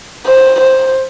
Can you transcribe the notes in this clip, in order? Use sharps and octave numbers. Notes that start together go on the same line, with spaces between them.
C5
C5